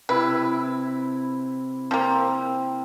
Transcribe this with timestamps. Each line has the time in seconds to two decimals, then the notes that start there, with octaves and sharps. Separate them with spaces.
0.09 C3 E4 B4
1.91 F3 A#3 C4